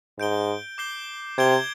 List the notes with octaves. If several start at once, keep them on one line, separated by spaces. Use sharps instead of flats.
G#2 G6 D7 G7
D6 G6 C7 G7
C3 G#6 D7 G7